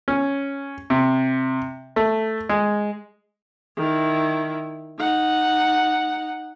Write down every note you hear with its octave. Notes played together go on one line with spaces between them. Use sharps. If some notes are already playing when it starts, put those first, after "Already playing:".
C#4
C3
A3
G#3
D#3 E4
D#4 F#5